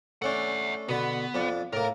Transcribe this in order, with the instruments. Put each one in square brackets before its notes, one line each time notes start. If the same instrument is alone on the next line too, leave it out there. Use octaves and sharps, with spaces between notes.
[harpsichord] A3 C#4 D4 [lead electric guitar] E5 F#5
[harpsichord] B2 D3 [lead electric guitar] B3
[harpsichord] F2 D4
[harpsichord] A2 A#3 [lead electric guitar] A#4